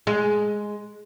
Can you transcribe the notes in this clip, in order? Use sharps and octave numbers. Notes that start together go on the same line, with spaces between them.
G#3